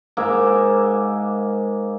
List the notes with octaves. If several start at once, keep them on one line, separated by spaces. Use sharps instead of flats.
G#2 A#3 E5 D6